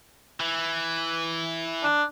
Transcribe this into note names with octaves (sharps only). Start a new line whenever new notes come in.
E3
D4